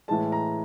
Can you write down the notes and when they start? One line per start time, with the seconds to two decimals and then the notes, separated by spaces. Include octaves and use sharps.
0.08 A2 E3 G#3 A5
0.32 A#5